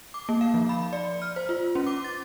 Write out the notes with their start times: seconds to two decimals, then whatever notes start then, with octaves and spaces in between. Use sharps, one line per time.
0.14 D6
0.29 A#3
0.41 F5
0.54 F3
0.69 B5
0.93 D5
1.22 F6
1.36 C5
1.49 F4
1.75 C#4
1.87 D6
2.04 A6